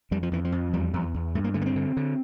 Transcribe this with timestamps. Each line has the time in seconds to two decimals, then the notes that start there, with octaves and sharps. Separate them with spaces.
0.11 F2 G3
0.23 F3
0.32 F2 E3
0.44 F3
0.52 F2
0.73 E2 G3
0.93 E2
1.14 E2
1.35 G2 A3
1.44 A#3
1.54 D3 A3
1.61 A#3
1.66 C4
1.76 D3
1.97 D3